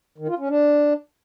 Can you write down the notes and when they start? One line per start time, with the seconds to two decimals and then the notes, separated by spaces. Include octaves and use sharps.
0.18 D#3
0.28 F4
0.39 C#4
0.49 D4